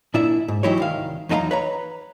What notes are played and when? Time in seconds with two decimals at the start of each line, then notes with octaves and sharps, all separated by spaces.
0.14 A#2 D4 E4 D5 E5
0.48 G#2
0.63 E3 F#3 D#4 E4 G4 C#5
0.78 C2 D#3 F5
1.29 E2 F#3 D#4 G#4 F5 A#5
1.51 B4 C#5 A#5